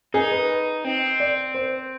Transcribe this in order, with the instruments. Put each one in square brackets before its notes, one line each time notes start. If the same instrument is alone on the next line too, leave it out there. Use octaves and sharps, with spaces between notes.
[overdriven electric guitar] D#4 [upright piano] G#4
[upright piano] B4
[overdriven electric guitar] C4
[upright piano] D5
C5